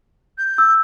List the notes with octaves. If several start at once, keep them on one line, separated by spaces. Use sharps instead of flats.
G6
E6